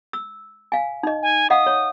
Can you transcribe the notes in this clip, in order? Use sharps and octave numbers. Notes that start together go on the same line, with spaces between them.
E6
F5 G#5
D#4 D#5
G#5
D#5 F5 F#5 D#6
C#5